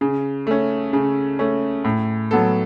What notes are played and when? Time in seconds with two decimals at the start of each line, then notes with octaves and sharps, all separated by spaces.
0.01 C#3
0.47 A3 C#4
0.93 C#3
1.39 A3 C#4
1.84 A2
2.31 F#3 B3 A4